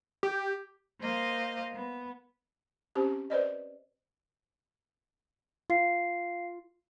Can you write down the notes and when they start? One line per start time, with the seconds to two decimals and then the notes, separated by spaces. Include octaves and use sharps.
0.23 G4
1.00 A#3 C5 D#5 F5
1.72 B3
2.95 C4 C#4 G4 C5
3.30 B4 C5 D5 D#5
5.70 F4 F5 C7